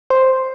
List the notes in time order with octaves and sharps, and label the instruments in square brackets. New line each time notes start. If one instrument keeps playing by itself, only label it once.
[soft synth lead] C5